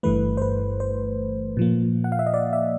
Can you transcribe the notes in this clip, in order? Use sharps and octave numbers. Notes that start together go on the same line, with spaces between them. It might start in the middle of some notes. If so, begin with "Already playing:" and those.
G1 G2 E3 A3 B4
C5
B4
C5
A#2 F3 A#3
F#5
F5
E5
D#5
D5
E5